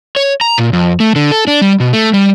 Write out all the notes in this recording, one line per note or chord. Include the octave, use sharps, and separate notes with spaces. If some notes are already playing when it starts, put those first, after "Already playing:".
C#5
A#5
A#2
F2
A3
D3
A4
D4
G3
B2
A3
G3